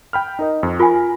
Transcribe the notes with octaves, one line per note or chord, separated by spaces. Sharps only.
G5 B5 F6
D#4 A#4 D#5
F2
F4 A#4 G#5 B5